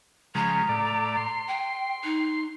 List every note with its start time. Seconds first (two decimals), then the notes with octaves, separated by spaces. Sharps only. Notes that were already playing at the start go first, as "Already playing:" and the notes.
0.35 C#3 F3 G#3 A#5
0.69 A2 D5
1.17 C6
1.47 G5
2.03 D#4